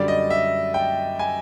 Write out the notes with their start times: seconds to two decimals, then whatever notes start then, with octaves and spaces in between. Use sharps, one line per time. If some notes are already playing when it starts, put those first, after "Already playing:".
Already playing: F#2 D3 G3 D5
0.08 D#5
0.30 E5
0.74 G5
1.19 G#5